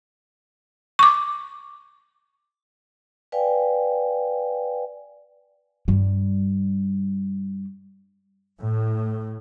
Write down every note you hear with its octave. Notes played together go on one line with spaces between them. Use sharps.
C#6 D6
B4 D5 F5 G5 G#5
G2 G3
A2